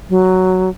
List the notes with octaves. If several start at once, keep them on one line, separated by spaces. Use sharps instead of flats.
F#3